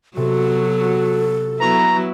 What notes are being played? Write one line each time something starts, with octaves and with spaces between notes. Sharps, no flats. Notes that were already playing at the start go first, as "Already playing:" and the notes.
C3 F#3 B3 F#4 A4
F#3 B3 E4 B4 A#5 C#6